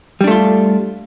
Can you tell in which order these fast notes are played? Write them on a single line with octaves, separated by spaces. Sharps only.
G3 D4 A3 F4